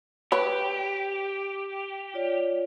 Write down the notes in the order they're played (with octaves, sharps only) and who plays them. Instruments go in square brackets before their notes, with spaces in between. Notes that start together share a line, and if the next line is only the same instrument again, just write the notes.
[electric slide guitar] G4 [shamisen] B4 C#5
[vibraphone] F4 C#5 D5